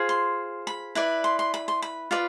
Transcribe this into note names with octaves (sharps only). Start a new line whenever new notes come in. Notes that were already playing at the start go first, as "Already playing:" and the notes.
Already playing: F4 G#4 C5
C6
B5
E4 B4 D5
C6
C6
B5
C6
B5
F4 B4 D5